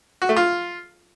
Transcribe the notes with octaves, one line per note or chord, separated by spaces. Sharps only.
F#4
A3
F4